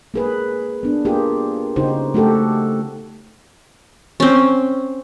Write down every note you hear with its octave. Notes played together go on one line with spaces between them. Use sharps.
A#3 G#4 B4
B3 D4
A#3 F4 G4 G#4
C#3 D#4 F#4 G4 C5
A3 F#4 G4 A4
C4 C#4